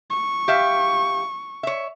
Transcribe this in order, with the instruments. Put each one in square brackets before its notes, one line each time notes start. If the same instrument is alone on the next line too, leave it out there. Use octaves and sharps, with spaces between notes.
[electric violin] C#6
[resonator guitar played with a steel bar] G4 E5 F5
C#5 E5